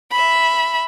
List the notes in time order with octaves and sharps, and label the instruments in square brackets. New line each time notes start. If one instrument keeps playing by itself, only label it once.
[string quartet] E5 B5